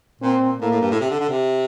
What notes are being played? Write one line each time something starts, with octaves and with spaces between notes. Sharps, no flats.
A#2 C4
A#2
A2 A#3
A2
G2
A2
C3
D3
D3
C3